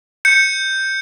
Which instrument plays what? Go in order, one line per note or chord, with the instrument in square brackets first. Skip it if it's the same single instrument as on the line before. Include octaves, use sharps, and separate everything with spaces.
[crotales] G6 C#7